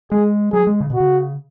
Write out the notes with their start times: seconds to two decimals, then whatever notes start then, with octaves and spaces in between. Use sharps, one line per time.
0.11 G#3 G#4
0.53 F#3 G#4
0.67 G#3
0.80 C#3
0.90 B2 F#4
1.00 C#3